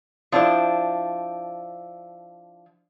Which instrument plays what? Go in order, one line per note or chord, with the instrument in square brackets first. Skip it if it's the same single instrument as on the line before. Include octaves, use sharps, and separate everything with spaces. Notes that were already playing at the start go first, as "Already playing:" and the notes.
[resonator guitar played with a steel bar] F3 D4 E4 C5